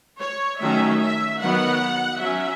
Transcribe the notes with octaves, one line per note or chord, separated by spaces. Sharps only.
C#5
D#3 F#3 A3 C#4 E5
E5
D#3 F#3 B3 F#5
F#3 C#4 E5